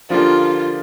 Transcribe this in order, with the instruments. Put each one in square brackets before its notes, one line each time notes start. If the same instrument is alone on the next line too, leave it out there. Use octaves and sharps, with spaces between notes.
[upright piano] D3 F3 A#3 D4 G4 [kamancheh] F4